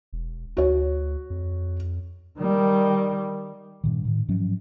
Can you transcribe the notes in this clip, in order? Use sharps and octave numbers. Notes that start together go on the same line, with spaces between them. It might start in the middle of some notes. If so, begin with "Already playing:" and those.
E1
D2 F#4 C#5
F2
D#3 G3
G2 A#2 D#3
A2 D#3
G#2 F3 F#3 C#4